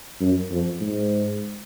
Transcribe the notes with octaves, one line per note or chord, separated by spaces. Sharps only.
F#2
F2
G#2